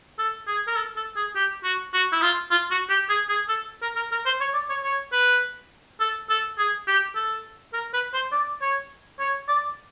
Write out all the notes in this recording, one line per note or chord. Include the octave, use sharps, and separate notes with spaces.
A4
G#4
A#4
A4
A4
G#4
G4
F#4
F#4
E4
F4
F4
F#4
G4
G#4
G#4
A4
A#4
A#4
A#4
C5
C#5
D5
C#5
C#5
B4
A4
A4
G#4
G4
A4
A#4
B4
C5
D5
C#5
C#5
D5